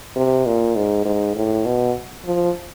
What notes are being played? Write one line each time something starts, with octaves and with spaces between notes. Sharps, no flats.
C3
A#2
G#2
G#2
A2
B2
F3